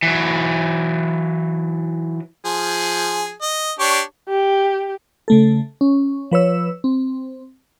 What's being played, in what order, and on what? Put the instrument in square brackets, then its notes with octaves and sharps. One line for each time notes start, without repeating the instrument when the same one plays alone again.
[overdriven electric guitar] E3 F#3
[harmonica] F3 G#4
D#5
D4 G4 C#5
[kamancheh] G4
[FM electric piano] C#3 A3 A4
C#4
F3 B4 C#5 E6
C4